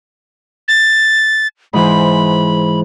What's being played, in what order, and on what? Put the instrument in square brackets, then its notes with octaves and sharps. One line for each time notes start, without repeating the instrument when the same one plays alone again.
[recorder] A6
[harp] G#2 E3 C5 [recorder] B5